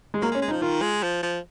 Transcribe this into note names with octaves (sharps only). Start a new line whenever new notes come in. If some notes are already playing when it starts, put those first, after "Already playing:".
G#3
F#3 A#3
G#3
C#4
G#3
D#4
F3
D#3 F4
G#3
F3
F3